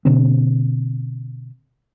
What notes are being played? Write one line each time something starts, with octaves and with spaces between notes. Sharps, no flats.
B2 D3 A#3 C4